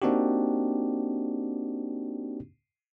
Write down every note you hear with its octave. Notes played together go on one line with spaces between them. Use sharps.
A#3 C4 D4 D#4 F#4 G4